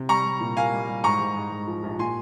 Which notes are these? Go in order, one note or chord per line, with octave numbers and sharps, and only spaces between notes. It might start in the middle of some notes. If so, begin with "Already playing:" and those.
Already playing: C3
G3 A#5 C#6
G3
A#2
A#3 F5 G#5
G3
G3
G#2 A#5 C#6
G#2
G#2
G#2
F3
A#1
A#2 G#5 C6